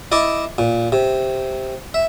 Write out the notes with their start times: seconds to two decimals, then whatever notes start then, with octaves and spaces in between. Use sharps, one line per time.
0.12 E4 D#5 A5 D6
0.58 A#2
0.92 C3
1.94 E5